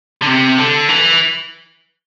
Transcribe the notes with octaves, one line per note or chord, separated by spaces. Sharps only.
D3
C3
D3
E3